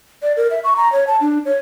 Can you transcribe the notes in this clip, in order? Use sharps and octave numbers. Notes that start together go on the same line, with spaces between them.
D5
A#4
E5
C#6
A#5
C#5
A5
D4
C#5